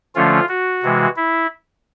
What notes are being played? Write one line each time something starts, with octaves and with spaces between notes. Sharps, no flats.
D3 F3 A3 C#4 F4
F#4
C3 E3 G#3
E4